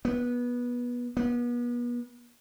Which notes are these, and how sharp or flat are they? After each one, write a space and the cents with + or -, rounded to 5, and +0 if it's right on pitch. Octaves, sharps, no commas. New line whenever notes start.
B3 -20
B3 -35